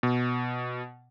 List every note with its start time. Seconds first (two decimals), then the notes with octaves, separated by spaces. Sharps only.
0.03 B2